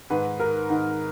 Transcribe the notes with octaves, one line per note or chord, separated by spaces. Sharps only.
G#2 D#3 B4
A#4
G#2 D#3